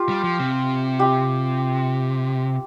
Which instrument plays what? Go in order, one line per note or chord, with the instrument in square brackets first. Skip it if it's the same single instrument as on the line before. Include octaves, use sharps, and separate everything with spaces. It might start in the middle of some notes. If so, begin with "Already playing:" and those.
Already playing: [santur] F4 G4
[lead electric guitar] G3
F3
C3
[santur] G4